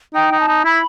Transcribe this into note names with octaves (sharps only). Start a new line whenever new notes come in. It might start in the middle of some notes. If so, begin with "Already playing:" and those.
D#4 G5
D#4
A5
D#4
E4 B5